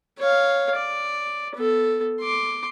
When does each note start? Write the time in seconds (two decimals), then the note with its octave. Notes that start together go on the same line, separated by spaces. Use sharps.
0.19 C#5 F5
0.76 D5
1.56 B3 A4
2.20 C6 D6